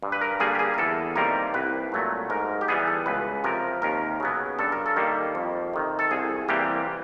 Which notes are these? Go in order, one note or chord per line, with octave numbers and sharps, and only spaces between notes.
G2
B4
A#4
D3 G3 A#3 G#4
G4
G#4
A#4
E2 A4
C3 D#3 G3 A#3 A#4
C2 B4
A#2 F#3 A3
G#2 A#4
G4
E3 G3 B3 G#4
A4
C#2 B4
C3 F3 A#4
D#2 A#4
C#3 F#3 B3
G2 A4
A#4
A4
D#3 G3 A#3
F2
C3 D#3
A4
C2 G#4
C3 E3 G3 A#3 G4